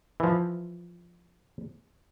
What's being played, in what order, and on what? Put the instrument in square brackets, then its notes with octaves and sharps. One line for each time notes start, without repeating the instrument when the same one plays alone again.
[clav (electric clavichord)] E3 F3